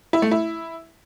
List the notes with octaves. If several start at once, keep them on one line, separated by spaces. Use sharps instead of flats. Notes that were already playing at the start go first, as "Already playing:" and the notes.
E4
A3
E4